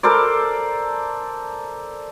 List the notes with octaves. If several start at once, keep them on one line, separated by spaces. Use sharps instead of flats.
A4 A#4 C5 D5